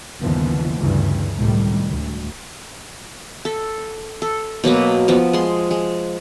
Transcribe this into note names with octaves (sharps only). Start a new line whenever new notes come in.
G1 D#2 C#3 E3 F3 B3
D2 G2 C#3 E3
C#2 A2 C3 D#3 G3
D2
A4
A4
B2 F#3 A#3 B4
F3 B3
G#3 C6
G#3